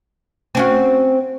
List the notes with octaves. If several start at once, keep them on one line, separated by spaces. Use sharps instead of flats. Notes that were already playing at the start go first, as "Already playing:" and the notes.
C4 C#4 F#4